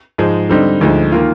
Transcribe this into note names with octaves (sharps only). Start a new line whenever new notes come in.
G#2 F3 G#3
D3 G3 C4 D#4
D2 D3 F3 G#3 D#4
D#3 A#3 F4